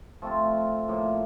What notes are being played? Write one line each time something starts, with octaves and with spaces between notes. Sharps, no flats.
F3 A3 C4 F4
A2 F3 A#3